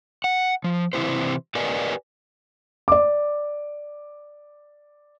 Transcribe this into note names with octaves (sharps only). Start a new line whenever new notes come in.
F#5
F3
C3 E3 F#3 E4 G4 C5
G4 A#4 B4 D5 D#5 G#5
D5 D6